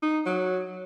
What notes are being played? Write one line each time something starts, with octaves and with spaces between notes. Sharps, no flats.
D#4
F#3